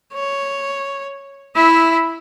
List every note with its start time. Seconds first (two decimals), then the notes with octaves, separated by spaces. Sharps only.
0.13 C#5
1.55 E4 E5